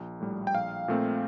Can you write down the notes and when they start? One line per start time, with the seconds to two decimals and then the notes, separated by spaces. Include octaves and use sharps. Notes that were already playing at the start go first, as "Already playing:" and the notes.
Already playing: A#1
0.21 A2 G3
0.47 G5
0.54 A#1 F5
0.88 A#2 A3 C4